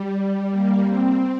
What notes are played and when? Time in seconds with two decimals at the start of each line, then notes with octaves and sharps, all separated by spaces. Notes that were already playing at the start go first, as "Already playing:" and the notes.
Already playing: G3
0.49 A#3
0.83 C4